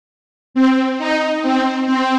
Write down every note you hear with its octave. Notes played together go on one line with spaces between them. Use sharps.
C4
D#4
C4
C4